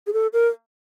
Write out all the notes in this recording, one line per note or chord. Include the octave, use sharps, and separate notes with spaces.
G#4
A4
A#4